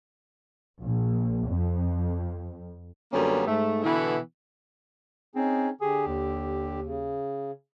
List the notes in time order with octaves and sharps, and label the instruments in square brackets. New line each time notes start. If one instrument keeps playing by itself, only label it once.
[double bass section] A#1
F2
[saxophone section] F#2 D3 G3 A#3 B3 C#4
G#2 A3
B2 D3 E3 B3 E4
[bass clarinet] C4 [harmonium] C#4 D#4 G#4
[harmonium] D3 G4 [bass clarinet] G#4
[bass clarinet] D#2
[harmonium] C#3